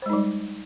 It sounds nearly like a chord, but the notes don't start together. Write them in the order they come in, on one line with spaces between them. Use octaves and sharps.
C5 G#3 D#4 G3